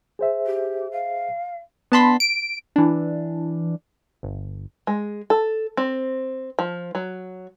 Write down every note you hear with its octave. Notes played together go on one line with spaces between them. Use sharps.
G#4 C5 E5
G4
F5
B3 D4 A5 B5 C6 B6
D7
E3 D4
G1
G#3
A4
C4
F3
F#3